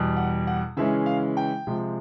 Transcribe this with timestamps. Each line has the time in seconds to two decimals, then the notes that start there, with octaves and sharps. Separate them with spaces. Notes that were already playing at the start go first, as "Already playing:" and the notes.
Already playing: E2 B2 G3
0.17 F#5
0.47 F#5
0.77 C#3 E3 G#3 C#4 E5
1.06 F5
1.37 G5
1.67 C3 F3 G#3